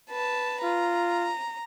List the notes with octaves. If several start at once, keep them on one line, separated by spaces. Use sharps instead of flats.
B4 A5
F4 A#5